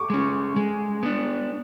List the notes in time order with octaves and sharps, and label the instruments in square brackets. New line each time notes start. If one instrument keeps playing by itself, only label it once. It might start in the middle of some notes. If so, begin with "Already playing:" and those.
Already playing: [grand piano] C#6 D6
[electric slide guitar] G#3 C#4
G#3
B3 D4